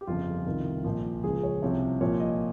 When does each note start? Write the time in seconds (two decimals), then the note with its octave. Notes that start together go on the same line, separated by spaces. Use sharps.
0.01 G4
0.07 G1 F2 C#3 F3 F4
0.46 C2 C3 D#3
0.84 A#1 A#2 F3
1.23 C#2 C#3 F3 G#4
1.43 C#5
1.62 C2 C3 F3 C#5
2.01 A#1 A#2 F3 C#5
2.20 D#5